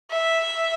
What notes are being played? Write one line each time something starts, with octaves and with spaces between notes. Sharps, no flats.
E5